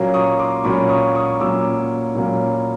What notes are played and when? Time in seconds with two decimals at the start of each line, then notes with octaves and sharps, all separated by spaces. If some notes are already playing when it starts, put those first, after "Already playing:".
Already playing: A#2 F#3 A#3 C#4
0.14 C#6 D#6
0.39 C6 D6
0.64 A#2 F#3 A#3 C#4 B5 C#6
0.89 C#6 D#6
1.15 C#6 D#6
1.40 A#2 F#3 A#3 C#4 D6 E6
2.15 A#2 F#3 A#3 C#4